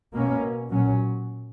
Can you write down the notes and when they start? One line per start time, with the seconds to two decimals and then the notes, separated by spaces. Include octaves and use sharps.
0.13 B2 A#3 C#4
0.70 A#2 F#3 C#4